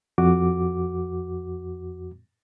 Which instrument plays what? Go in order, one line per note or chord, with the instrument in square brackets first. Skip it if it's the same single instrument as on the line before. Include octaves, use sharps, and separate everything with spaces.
[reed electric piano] F2 F#4 D6